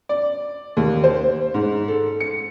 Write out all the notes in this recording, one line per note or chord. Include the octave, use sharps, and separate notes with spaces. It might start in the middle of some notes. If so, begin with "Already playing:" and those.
D5
D#2
C5
G#2
A4
C#7